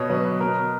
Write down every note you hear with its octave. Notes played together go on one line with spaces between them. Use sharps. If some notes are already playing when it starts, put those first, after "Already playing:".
Already playing: B2 C#5 D#5
F#3 B4
B2 A#4